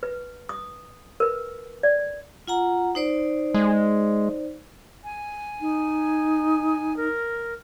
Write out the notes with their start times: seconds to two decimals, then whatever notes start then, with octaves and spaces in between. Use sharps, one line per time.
0.03 B4
0.49 D#6
1.20 A#4 B4
1.83 D5
2.47 F4 F#5 A#5
2.95 D#4 C5 D5
3.54 G#3
5.04 G#5
5.61 D#4
6.97 A#4